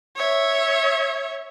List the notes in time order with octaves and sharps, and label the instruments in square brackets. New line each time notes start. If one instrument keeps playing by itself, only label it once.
[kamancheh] C#5 E5